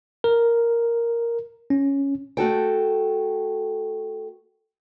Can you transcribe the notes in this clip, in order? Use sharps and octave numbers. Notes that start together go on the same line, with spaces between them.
A#4
C#4
A3 F#4 A4 G5